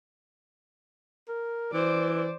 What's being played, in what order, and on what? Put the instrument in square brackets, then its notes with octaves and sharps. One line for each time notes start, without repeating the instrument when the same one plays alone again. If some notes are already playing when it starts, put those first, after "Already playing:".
[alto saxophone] A#4
[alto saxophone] E3 [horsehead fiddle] C5 D5